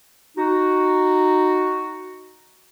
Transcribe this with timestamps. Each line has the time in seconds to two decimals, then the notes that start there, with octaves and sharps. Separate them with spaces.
0.37 D#4 F#4